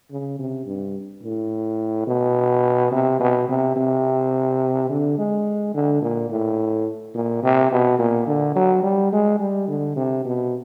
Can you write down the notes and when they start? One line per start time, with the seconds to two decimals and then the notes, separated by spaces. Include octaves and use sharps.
0.11 C#3
0.39 C3
0.66 G2
1.23 A2
2.07 B2
2.92 C3
3.20 B2
3.49 C3
3.76 C3
4.89 D3
5.18 G#3
5.74 D3
6.02 A#2
6.30 A2
7.15 A#2
7.43 C3
7.72 B2
7.99 A#2
8.27 D3
8.56 F#3
8.83 G3
9.12 G#3
9.40 G3
9.68 D3
9.96 C3
10.25 B2